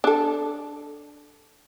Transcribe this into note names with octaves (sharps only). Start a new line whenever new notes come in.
D4 A4